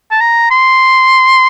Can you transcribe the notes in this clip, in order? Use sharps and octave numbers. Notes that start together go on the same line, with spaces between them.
A5
A#5
C6